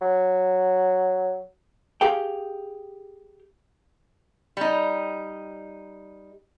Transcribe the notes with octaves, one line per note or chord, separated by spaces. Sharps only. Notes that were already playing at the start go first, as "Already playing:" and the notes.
F#3
G4 G#4 F5 G5
G3 D#4